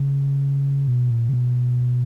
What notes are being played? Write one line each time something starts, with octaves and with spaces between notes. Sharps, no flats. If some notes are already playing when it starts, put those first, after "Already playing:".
Already playing: C#3
B2
A#2
C#3
B2